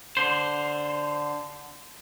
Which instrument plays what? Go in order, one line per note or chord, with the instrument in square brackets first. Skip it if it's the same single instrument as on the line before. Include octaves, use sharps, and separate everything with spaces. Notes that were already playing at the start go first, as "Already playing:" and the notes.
[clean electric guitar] D3 C5